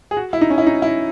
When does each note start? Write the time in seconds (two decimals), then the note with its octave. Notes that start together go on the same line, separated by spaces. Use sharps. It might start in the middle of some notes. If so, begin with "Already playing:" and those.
0.11 G#4
0.17 F#4
0.33 E4
0.41 D#4
0.50 C#4
0.58 E4
0.67 D#4
0.82 E4